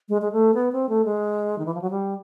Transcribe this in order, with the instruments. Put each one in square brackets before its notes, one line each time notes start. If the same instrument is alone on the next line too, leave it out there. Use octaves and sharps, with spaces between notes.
[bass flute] G#3
G#3
A3
B3
C4
A3
G#3
D#3
E3
F3
F#3
G3